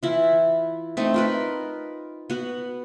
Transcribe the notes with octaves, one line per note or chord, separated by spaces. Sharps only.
E3 E4 F4
A3 C4 D#4
F4 A#4 B4
B3 F#4